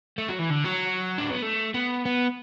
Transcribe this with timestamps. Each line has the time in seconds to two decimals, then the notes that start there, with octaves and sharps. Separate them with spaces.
0.18 A3
0.29 F#3
0.39 E3
0.51 D3
0.65 F#3
1.18 D4
1.31 B3
1.42 A3
1.74 B3
2.06 B3